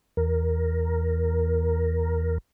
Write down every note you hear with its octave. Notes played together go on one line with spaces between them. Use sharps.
E2 A#4